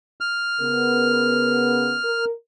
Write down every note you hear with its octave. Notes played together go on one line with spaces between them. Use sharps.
F6
C#3 B3 A#4
A#4